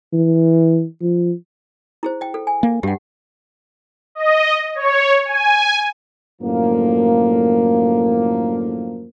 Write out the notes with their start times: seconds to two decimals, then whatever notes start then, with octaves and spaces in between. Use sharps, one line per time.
0.13 E3
1.01 F3
2.03 E4 G#4 C5
2.21 D#5 G5
2.34 A4
2.47 G#5
2.63 A#3
2.83 G2 G4 F#5
4.15 D#5
4.75 C#5
5.25 G#5
6.42 F#2 A2 D3 F3 A#3